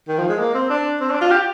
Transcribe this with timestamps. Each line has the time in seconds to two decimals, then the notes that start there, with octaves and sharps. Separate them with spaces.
0.08 D#3
0.18 F3
0.29 G#3
0.39 A#3
0.54 C4
0.70 D4
1.00 C4
1.10 D4
1.21 F4
1.31 G4